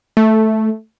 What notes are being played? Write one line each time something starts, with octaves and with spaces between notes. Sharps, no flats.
A3